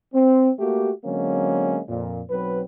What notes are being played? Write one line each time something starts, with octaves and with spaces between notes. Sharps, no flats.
C4
A3 A#3 F#4 G4
D3 F#3 G#3 A#3 C4 C#4
F2 A#2
B1 F#3 C4 B4